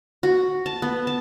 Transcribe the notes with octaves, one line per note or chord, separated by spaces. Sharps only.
F#4
A5
B3
A5